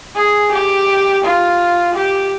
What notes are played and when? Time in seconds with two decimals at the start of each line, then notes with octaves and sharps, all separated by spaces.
0.15 G#4
0.52 G4
1.23 F4
1.95 G4